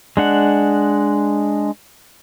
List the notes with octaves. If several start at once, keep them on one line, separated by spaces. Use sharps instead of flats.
G#3 D4 F#5